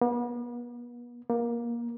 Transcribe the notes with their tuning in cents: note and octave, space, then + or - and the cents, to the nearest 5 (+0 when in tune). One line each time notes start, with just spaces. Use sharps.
B3 -40
A#3 +20